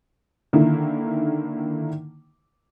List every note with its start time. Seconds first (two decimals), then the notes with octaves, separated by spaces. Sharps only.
0.53 D3 D#3 A#3 E4